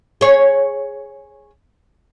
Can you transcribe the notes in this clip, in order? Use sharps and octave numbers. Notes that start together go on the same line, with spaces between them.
G#4 C#5